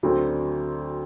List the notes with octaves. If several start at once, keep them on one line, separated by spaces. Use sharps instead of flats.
D2 D3 F#3 C4